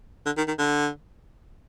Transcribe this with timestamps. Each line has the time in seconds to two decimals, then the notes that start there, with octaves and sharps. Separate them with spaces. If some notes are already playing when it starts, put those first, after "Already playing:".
0.26 D3
0.37 D#3
0.48 D#3
0.58 D3